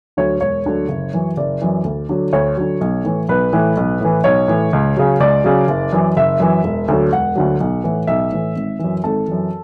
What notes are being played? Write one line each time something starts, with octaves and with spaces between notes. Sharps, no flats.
D2 D3 F#3 C#5
E1 C#5
D2 D3 F#3
F#1
F#2 E3
F#1 D5
F#2 E3
D2
D3 F#3
D2 C#5
D3 F#3
B1
A2 E3
B1 B4
A2 E3
B1
A2 E3
B1 C#5
A2 E3
C#2
C#3 F#3
C#2 D5
C#3 F#3
F#1
F#2 E3
F#1 E5
F#2 E3
E1
D2 D3 F#3
E1 F#5
D2 D3 F#3
B1
A2 E3
B1 E5
A2 E3
G#1
F#2 E3
G#1 A4
F#2 E3